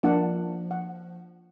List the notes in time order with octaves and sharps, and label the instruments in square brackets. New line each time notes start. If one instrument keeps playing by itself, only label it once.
[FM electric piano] F3 [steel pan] A#3 D4 F#5
[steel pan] F#5